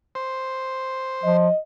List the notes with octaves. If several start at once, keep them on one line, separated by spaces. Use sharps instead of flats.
C5
F3 D#5